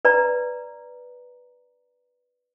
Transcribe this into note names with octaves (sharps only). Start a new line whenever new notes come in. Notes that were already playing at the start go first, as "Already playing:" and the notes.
B4 D5 A#5